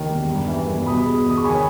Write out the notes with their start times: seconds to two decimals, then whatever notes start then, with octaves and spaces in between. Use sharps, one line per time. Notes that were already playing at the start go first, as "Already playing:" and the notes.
Already playing: D#2 D#3
0.09 E1
0.29 G2
0.48 E3
0.67 G1
0.86 B2 B5 D#6
1.06 G#3
1.26 E2 D#6
1.37 C#6
1.44 D#3 G#5 B5
1.53 C#5